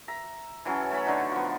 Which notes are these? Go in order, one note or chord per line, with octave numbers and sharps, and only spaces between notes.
E5 A#5
E3 F#3 C#4 A4
A3 A4 C#5 B5
D3 D#4 F#4
F3 B3